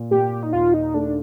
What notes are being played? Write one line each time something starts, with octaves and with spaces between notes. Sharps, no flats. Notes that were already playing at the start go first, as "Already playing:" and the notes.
Already playing: A#2
A#2 G4
D#4
D#2 F4
D#4
A3 D4